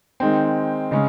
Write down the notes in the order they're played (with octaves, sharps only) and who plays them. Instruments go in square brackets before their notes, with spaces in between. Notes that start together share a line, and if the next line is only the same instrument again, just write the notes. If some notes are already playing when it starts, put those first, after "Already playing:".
[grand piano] D#3 G#3 C4
C#3 G#3 C#4